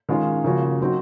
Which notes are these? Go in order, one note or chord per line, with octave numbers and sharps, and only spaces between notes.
D#3 G#3 C#4 F4
C#3 F3 A#3 C#4 F#4
F#3 C4 D#4 F#4